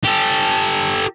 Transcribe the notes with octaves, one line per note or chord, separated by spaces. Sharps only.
G4 A4